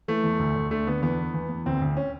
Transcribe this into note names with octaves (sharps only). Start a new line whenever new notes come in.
E3 A3
E2
D2
D2
D3 A3
D3 B3
E2 B3
E3
E2
E2
D2 C4
D2
C#4